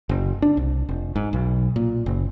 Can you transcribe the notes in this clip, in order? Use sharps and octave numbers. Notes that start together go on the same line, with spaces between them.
F#1
D4
C2
F1
G#2
B1
A#2
F#1